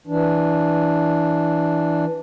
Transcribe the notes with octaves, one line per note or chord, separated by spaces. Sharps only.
E3 D4